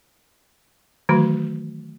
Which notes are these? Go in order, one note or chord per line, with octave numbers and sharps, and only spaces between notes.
D#3 E3 F#3 A3 F#4